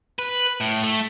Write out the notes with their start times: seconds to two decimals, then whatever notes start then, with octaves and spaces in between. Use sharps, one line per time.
0.19 B4
0.61 A2
0.84 A3